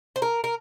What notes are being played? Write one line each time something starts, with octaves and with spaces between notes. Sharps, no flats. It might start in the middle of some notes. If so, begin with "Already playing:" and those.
C5
A#4
A#4